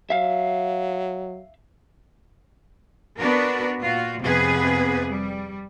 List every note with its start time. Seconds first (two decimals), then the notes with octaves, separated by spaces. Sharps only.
0.10 F#3 E5 F5
3.18 B3 D4 F#4 A#4
3.80 A#2 F4 F#4
4.21 F2 C3 B3 G#4 B4
5.09 G3